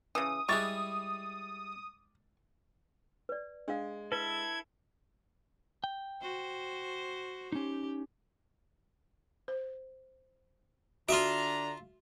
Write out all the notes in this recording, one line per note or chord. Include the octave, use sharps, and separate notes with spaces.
C#3 E3 D#6
G3 G#3 E4 G#4 C#6 D6 A6
B4 D5
G#3 D4 F5
E4 A4 B4 G#6
G5
F#4 C5
C#4 D#4 G4
C5
D3 D4 F4 F#4 E5 A#5